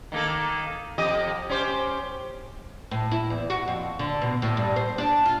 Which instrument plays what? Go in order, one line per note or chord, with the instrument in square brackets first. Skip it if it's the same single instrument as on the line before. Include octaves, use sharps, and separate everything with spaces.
[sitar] D#3 A#3 A4
F2 G4 D#5
C#4 G4 C5
[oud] A2
E4
E2
F#4
F2
D3
B2
A2
G2
C5
D4
F4